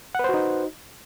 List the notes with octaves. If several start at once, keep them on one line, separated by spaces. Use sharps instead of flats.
D#4 F#4 B4 C5 F#5